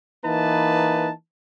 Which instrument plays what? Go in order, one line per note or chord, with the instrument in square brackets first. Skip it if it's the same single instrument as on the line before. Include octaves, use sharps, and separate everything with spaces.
[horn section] E3 A#3 D#4 B4 A5